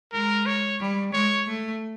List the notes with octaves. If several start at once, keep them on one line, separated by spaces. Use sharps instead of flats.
G#3 A#4
C#5
G3
G#3 C#5
A3